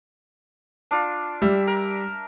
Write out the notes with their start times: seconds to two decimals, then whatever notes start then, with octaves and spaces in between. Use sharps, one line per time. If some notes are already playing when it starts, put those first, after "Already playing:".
0.91 D4 F4
1.42 G3 E5
1.67 A#4